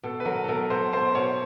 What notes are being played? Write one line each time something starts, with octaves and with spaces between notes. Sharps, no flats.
B2 A4
B4
F#3 A#4
A4
B2 A#4
B2 C5
B2 C5
B2 C#5